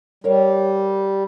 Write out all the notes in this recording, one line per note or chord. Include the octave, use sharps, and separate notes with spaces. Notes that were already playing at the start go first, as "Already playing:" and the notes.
G3 A#4 C#5 F5